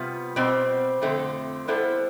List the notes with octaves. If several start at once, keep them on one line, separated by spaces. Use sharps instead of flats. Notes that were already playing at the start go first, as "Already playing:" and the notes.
Already playing: C3 G3 B3 F4
B2 G3 C4
F2 D3 A3 C4
G3 B3 E4 A4 C5